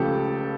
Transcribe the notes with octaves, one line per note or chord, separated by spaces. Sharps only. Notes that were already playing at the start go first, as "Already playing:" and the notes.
Already playing: C#2 C#3 F3 A3 G4 A4